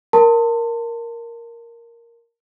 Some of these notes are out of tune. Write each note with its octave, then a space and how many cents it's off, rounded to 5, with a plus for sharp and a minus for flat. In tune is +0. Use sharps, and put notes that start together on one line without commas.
A#4 +0 A5 +30 C6 +0